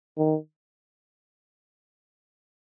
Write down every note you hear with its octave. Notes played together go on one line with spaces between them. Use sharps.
D#3